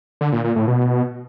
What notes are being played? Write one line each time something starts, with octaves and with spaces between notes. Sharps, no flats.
D3
A#2
A#2
A2
B2